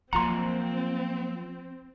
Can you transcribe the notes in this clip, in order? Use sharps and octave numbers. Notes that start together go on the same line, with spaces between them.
F3 F#3 A#3 C4 F4 F#5 A#5 C6